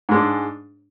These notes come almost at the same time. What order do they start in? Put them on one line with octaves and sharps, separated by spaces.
G#2 G#3 D4